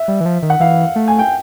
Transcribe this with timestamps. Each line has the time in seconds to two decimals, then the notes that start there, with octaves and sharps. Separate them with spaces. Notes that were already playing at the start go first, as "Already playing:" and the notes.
Already playing: E5
0.08 G3
0.21 E3
0.26 F3
0.43 D#3
0.50 F#5
0.60 E3 F5
0.96 A3
1.08 G#5
1.19 G5